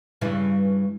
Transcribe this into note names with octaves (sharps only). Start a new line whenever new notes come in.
G2 C#3 E3